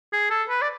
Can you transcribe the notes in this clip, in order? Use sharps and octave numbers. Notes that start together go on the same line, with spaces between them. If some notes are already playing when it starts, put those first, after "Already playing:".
G#4
A4
B4
D5